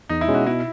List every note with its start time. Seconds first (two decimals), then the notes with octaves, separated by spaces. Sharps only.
0.09 E2 D#4
0.21 E4
0.28 B2 G#3 C#4
0.34 F#4
0.46 B2 E4